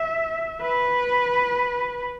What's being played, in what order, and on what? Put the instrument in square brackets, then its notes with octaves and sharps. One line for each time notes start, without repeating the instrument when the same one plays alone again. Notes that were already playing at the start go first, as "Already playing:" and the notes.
Already playing: [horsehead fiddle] E5
B4